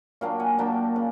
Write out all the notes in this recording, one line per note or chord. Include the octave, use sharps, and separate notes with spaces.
A#2 F#3 A#3 D4 F5 G5
F#5 G#5
A#2 F#3 A#3 D4 G5 A5
C#3